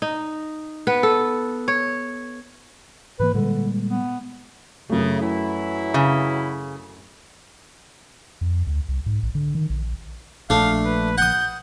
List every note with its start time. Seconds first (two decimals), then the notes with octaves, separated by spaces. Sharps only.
0.02 D#4
0.87 B3 B4
1.03 A4
1.68 C#5
3.20 G#2 E3 A#3 B4
3.34 A#2 D3 G3 G#3
3.89 B3
4.90 F#2 A2 C#3 A3
5.20 E3 F#3 E4
5.94 C#3
8.41 F2
8.67 D2
8.89 C2
9.06 G#2
9.23 A#1
9.35 D3
9.55 D#3
9.70 A#1
10.50 A#1 A3 D4 F5
10.86 B4
11.18 F#5 D#6 G6